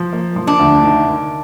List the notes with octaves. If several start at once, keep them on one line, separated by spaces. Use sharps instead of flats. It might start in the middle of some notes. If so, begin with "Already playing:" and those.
Already playing: F3
A#3
F3
D4
D2
D#3
D#3